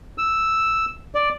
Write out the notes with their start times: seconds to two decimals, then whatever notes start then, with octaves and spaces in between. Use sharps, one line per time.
0.18 E6
1.15 D5